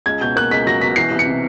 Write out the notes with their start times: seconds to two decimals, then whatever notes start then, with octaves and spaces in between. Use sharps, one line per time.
0.06 C#2 G#6
0.21 B2 G6
0.36 A#3 F#6
0.51 C#2 B6
0.67 F#3 A#6
0.81 B2 B6
0.96 E3 C7
1.11 C2
1.19 C#7
1.26 C3